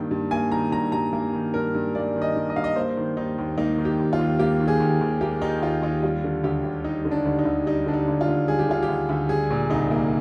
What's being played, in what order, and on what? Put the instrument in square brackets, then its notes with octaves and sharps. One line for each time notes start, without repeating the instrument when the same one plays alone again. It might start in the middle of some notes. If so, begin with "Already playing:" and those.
Already playing: [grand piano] G2 D#3 A#3
G2
A#3 G#5
D#3 A#5
G2 A#5
G2 A#5
A#3
D#3
G2 A#4
G2
A#3 D5
D#3
D#5
G2
D#5
G2 F5
D#5
A#3 C5
D#3
D#2 D#4
D#2
A#3 D#4
D#3
G4
D#2
F4
D#2
A#3 G4
D#3
G#4
D#2
D#2
A#3 G4
D#3 D#4
D#2 F4
D#2 D#4
G3 F4
D3
D2 G4
D2
G3 D#4
D3
D4
D2
D#4
D2
G3 D#4
D3 D4
D#4
D2
F4
D2
G3 G#4
G4
D3 F4
G4
D2
D2
G3 G#4
A#2
C2 D#4
A#3